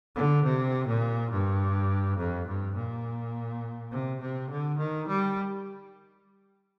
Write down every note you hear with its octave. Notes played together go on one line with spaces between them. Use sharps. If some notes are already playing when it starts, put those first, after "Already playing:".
D3
C3
A#2
G2
F2
G2
A#2
C3
C3
D3
D#3
G3